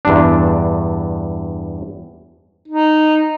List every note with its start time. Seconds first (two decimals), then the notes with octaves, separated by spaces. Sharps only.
0.05 E2 G2 D4
2.68 D#4